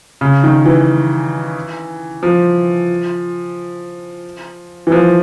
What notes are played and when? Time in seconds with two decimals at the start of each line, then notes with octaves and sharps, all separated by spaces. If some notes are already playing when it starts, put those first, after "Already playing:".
0.21 C#3
0.44 D#3
0.65 E3
2.23 F3
4.87 E3
4.92 F3